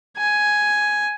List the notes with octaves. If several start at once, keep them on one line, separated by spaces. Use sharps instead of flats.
G#5